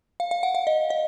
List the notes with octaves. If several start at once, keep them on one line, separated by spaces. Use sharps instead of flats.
F5
F5
F#5
F5
D#5
D#5